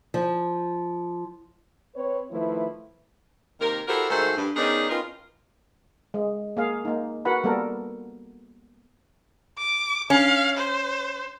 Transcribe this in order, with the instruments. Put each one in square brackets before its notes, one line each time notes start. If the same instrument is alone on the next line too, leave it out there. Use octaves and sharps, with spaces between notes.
[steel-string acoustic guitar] F3
[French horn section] C4 B4 C#5
D#3 F3 A3 E4 B4
[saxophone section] C3 D#3 A#3 A#4
E4 F#4 G4 A4 A#4 C5
G#2 D#3 A3 F#4 A4 C5
G2
D#3 B3 C#4 D#4 G#4 D5
C4 C#4 D#4 F4 A#4 B4
[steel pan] G#3
A#3 G#4 F5
A#3 D#4
F#4 A#4 B4 F#5 B5
G3 A#3 B3 A4 A#4
[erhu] D6
[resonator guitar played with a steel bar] C#4 [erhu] F5
[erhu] C5